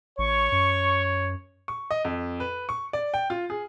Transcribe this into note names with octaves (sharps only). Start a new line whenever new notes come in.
A1 C#5 C#6
F#2
C#6
D#5
F2
B4
C#6
D5
G5
F4
G#4